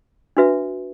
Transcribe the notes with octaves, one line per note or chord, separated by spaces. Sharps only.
D4 F#4 B4 E5